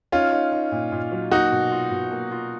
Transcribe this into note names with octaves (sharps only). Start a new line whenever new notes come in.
C#4 D#4 F4
D#4
D#4
A#2
A#2
F#3
A#3 D#4 F#4
B2
F4
B2
A#3
F4